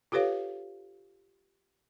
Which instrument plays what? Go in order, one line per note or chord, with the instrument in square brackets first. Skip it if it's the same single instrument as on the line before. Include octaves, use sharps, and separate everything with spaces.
[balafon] F4 G4 A4 B4 C#5 F5